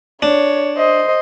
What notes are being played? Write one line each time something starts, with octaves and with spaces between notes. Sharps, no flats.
D4 C#5
C5 D#5